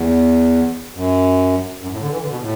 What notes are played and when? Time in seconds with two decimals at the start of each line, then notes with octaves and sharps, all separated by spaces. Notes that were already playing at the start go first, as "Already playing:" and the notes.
Already playing: E2
0.94 F#2
1.81 F#2
1.91 A2
2.00 D3
2.11 E3
2.20 D3
2.30 B2
2.40 A2